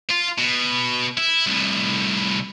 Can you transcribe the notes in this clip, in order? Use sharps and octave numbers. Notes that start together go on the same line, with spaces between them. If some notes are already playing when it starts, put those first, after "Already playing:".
F4
B2
E4
C2 A2